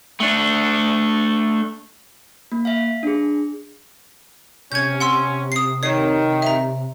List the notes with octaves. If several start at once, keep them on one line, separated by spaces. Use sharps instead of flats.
A3 D4
A#3
E5 F5
D4 G#4
C3 C#4 G6 G#6
F#5 C6 E6
D#6 C7
D#3 C#5 C7
E5 A#5